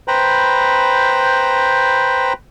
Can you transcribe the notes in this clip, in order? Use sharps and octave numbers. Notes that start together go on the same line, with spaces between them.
B4 C5 G5 A#5 B5